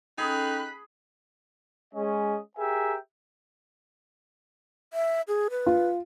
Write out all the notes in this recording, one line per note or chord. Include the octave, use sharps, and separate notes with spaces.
C#4 D#4 G#4 A4 G5 B5 F#6
G#3 C#4 D#5
G4 G#4 A#4 E5 G5 G#5
E5
G#4
B4
F4